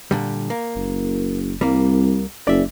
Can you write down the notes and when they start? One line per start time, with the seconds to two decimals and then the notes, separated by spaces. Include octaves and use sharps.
0.11 A#2 D3 G3
0.50 A#3
0.76 F#1
1.61 C2 G3 A#3
2.47 F#1 D5 E5